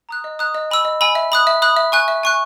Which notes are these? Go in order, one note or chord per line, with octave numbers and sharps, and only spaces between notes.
A#5 D#6 F#6
D#5
A#5 D#6 F#6
D#5
G#5 B5 E6
D#5
G#5 B5 E6
E5
B5 D#6 F#6
E5
B5 D#6 F#6
E5
G#5 C#6 F#6
E5
G#5 C#6 F#6